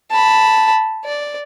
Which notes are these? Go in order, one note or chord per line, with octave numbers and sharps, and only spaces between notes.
A5 B5
D5